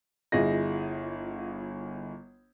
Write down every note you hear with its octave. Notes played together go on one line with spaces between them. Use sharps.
G1 E4 F4 G#4 D#5 A#6